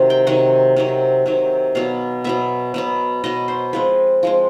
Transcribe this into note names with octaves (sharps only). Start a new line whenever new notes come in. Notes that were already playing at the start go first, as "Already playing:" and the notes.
Already playing: C3 D#3 F#3
G5
C3 D#3 F#3 F#5
C3 D#3 F#3
C3 D#3 F#3
B2 F#3 B3 F5
B2 F#3 B3 E5
B2 F#3 B3
B2 F#3 B3 D#5
C5
F3 G#3 C4 B4
F3 G#3 C4